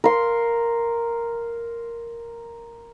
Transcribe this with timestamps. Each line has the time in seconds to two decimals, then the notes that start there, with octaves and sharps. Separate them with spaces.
0.04 A#4 C6